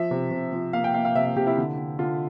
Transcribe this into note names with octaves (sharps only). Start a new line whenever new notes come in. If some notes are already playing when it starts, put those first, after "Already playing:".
Already playing: F3 E5
C3
C3
F3
A#3 F5
G5
A#3 F5
F5
C3 E5
E5
C3 G4
E4
D3
D3
D3 F4